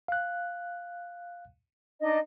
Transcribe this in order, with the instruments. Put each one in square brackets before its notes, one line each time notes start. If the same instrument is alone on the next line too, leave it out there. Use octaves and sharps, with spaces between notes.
[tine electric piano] F5 F#6
[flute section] D4 D#4 D#5